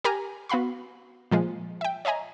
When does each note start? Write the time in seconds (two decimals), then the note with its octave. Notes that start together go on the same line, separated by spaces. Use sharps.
0.04 G4 A#4 G#5 A#5
0.49 B3 F#4 F5 B5 C6
1.31 A#2 F3 G#3
1.81 E5 G5
2.05 C#5 D#5 E5 G#5 A#5